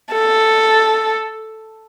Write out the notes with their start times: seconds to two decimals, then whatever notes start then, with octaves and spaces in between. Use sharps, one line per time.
0.12 A4